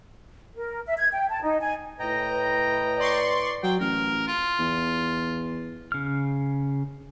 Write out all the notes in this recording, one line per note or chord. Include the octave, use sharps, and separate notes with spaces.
A#4
E5
G#6
G5
A5
D#4
G#5
A2 B4 D#5 G5 A#5
D5 C6 C#6
F#3 G5
A1 A#4
F4
E2
C#3 F6